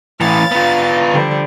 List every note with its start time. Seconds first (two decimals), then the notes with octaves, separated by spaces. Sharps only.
0.20 A2 E3 F5 A6
0.51 B3 F4
1.13 D3 F3 G3